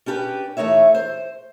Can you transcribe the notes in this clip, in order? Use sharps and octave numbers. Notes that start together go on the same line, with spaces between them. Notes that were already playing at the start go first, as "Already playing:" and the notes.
C#4 D4 G4 A#4 B4 G5
E3 A3 A#3 D#4 C#5 E5
C5